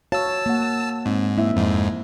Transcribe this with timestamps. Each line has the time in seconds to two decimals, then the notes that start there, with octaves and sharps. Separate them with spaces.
0.12 F#4 C#5 F5 A5 E6
0.46 A#3 F#5
1.06 G#2 C4
1.37 A#3 E4 E5
1.56 F2 G#2